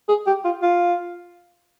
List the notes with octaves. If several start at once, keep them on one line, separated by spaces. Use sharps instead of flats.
G#4
G4
F4
F4